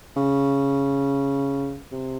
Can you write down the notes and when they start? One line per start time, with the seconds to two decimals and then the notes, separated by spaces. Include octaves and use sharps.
0.17 C#3
1.92 C3